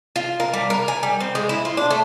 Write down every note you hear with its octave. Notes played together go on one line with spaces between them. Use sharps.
F4
A#4
G3
A#4
G#5
G3
C4
G#3
E4
F4
D4
A3